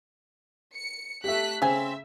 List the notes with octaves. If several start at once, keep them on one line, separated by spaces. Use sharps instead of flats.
C#7
A3 G4 E5 F#6 B6
C#3 C4 E5 G#5